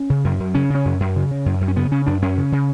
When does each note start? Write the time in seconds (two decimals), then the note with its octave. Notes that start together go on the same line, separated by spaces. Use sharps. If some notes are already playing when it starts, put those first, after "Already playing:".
Already playing: C#4
0.10 C#3
0.25 F#2
0.40 F#2
0.55 C#3 C#4
0.70 C#3 C#4
0.85 F#2
1.00 F#2
1.16 C#3
1.31 C#3
1.46 F#2
1.61 F#2
1.68 C#4
1.76 C#3 B3
1.91 C#3 C#4
2.06 F#2 D4
2.22 F#2 C#4
2.37 C#3
2.52 C#3